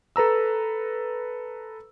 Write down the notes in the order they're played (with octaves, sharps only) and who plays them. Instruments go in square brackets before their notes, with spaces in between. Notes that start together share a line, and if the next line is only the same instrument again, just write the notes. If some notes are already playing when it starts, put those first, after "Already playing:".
[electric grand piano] A4 B4 A#5 E6